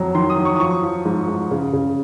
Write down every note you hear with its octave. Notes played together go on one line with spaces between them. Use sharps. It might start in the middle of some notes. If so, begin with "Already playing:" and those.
Already playing: F2 F#3 A#5
D#3 C6
D#6
F#3
C#6
D#6
F3 C#6
F3
G#2
G#2
C#3
C#3